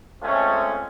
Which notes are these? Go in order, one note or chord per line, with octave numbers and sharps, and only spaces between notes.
G#3 A3 C4 C#4 F4